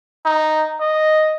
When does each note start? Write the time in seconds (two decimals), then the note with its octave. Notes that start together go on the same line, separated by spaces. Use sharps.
0.25 D#4
0.80 D#5